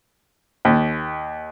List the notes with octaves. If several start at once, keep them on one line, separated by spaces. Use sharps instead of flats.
D#2